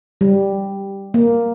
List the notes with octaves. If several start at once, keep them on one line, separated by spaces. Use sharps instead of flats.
G3
A#3